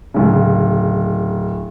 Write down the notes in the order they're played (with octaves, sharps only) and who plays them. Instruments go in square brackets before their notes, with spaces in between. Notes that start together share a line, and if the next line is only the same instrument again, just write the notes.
[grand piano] D1 C#3